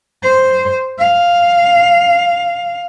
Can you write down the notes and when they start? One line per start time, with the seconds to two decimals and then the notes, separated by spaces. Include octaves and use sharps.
0.23 C5
0.99 F5